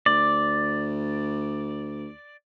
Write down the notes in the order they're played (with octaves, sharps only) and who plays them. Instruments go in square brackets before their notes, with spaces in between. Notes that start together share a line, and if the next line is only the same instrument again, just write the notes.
[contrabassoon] D2 [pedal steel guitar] D5